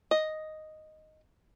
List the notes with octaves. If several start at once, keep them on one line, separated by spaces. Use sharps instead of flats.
D#5